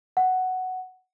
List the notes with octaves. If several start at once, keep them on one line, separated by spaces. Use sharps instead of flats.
F#5